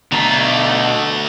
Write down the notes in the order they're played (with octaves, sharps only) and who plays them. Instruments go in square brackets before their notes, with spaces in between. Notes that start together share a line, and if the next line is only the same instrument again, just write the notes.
[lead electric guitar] B2 A#5 [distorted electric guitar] D3 A3